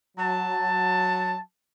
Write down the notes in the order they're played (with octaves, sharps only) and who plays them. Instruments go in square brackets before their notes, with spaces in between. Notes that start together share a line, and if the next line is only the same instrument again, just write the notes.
[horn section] F#3 A5